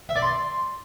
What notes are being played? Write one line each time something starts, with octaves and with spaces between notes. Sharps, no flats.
E5
D5
C6